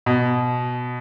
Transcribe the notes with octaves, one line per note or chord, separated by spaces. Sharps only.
B2